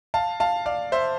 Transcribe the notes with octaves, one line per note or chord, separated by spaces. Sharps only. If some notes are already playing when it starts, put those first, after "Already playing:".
F5 A5
F5 A5
D5 F5
C5 E5